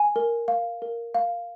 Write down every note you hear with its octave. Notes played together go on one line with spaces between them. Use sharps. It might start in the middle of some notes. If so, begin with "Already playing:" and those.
Already playing: G#5
A#4
F5
A#4
F5